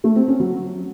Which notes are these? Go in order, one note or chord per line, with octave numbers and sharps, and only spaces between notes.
A3
C4
C#4
F#3